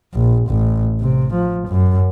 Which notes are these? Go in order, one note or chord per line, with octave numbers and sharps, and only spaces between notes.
A#1
A1
C3
F3
F#2